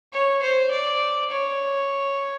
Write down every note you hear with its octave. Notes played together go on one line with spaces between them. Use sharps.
C#5
C5
D5
C#5